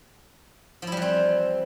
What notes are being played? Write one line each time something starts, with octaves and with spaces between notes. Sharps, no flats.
E3 F3 G3 C4 E4